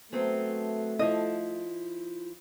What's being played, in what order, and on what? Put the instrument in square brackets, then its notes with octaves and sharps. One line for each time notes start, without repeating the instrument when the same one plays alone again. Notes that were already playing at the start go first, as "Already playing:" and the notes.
[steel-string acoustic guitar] F#3 B3 C4 [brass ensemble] A3
[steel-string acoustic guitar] F3 E4 [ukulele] D#5